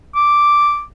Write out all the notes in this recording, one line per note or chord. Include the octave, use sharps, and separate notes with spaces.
D6